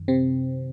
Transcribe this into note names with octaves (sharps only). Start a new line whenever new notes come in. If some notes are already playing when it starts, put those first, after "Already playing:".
Already playing: F#2 D#3
C3 C4